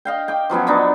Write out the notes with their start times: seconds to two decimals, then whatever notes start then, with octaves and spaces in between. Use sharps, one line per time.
0.05 D#5 F5 G5
0.28 G5 D6
0.50 F3 F#3 B3 C#4
0.67 B3 D4 D#4